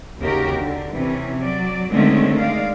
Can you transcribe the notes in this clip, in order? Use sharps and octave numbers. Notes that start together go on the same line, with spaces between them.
D#2 C#3 F#4 G4 A#4
D3
C3 E3 C#4
F#3 D5
D3 D#3 G#3 A3 C4 C#4
G#3 D5 F5